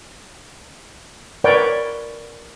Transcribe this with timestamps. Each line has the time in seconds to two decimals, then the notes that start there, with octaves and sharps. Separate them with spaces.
1.44 A#4 B4 C#5 D5 F#5 G5